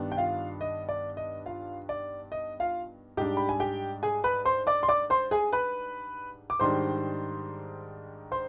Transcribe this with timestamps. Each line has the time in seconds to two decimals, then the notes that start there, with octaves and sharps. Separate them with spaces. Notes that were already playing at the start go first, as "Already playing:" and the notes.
Already playing: G2 D#3 B3 D4
0.12 G5
0.17 F4 F5
0.61 D#5
0.89 D5
1.17 D#5
1.46 F4 F5
1.89 D5
2.32 D#5
2.60 F4 F5
3.17 G#2 G3 D4 G4 G5
3.37 B5
3.49 G#5
3.60 G4 G5
4.03 G#4 G#5
4.24 B4 B5
4.45 C5 C6
4.67 D5 D6
4.83 C6
4.88 D5 D6
5.10 C5 C6
5.31 G#4 G#5
5.52 B4 B5
6.50 D6
6.59 G#2 D#3 G3 D4 C5 C6
8.32 C5 C6